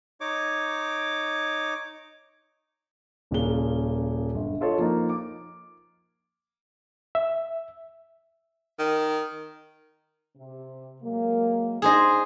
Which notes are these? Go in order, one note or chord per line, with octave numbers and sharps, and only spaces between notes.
D#4 C#5 D6
D#1 A#2 C#3 C#4 G7
G1
F4 A4 C#5 D#5
F3 A#3 D#4
D6
E5
D#3
C3
F#3 G#3 A#3
D4 D#4 G#4 C5 D#5